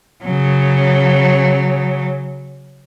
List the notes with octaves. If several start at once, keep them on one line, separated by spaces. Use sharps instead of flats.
C#3 F#3